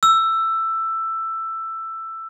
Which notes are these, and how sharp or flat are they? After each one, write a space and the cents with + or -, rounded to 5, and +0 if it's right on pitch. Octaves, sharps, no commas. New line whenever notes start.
E6 +10